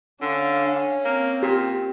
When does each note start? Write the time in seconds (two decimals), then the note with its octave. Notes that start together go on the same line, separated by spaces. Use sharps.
0.22 D3 C#4 D4 F5
1.05 A#3 C4
1.43 A#2 G4